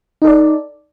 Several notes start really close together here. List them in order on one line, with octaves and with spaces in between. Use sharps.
D#4 A4 D5